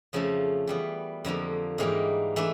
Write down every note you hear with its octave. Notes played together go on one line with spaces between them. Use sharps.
F2 C#3 F3 A3
E3 G3 B3
F2 D3 F3 A#3
G#2 E3 G3 A#3 D#4
E3 A3 D4